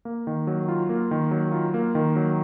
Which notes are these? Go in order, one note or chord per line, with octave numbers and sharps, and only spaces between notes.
A#3
D#3
F#3
F4
A#3
D#3
F#3
F4
A#3
D#3
F#3